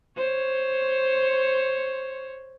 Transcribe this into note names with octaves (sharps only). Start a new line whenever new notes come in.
C5 C#5